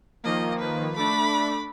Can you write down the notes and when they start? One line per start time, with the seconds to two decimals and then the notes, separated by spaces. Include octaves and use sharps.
0.24 D#3 F3 A#3 D#5
0.59 B4
0.96 A3 D4 B5 D6